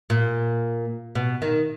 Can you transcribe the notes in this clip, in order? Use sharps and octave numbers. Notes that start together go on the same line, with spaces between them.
A#2
B2
D#3